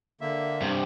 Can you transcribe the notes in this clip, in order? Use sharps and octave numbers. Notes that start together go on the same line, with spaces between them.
D3 A#3 E5
G2 C3